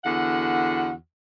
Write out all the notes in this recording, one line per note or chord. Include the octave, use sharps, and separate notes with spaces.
E2 D3 F#4 F#5